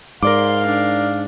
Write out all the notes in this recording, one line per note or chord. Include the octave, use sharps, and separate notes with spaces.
G#2 A#4 D5 F5 C6 D6
D4